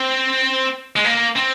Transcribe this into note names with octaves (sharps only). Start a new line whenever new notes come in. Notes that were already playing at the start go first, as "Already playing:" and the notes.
Already playing: C4
G#3
A#3
C4